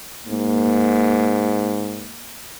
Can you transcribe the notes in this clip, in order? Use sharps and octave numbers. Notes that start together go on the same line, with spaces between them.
G#2 A#3